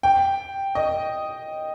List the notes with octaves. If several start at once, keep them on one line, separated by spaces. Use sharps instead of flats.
G5
D#5